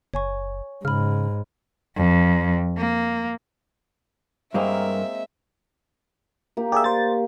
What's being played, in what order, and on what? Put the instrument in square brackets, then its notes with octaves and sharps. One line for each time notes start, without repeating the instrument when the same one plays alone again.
[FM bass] F#1 [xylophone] C#5 G#5 C#6
[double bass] G#2 [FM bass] C#3 [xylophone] B5 F6
[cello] F2
A#3
[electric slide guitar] G2 A#4 [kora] G#3 A#3 C4 [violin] E5
[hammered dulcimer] A#3 G4
[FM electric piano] G4 G#4 E5 [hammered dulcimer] D5
[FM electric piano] C5 A6 [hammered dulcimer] C#6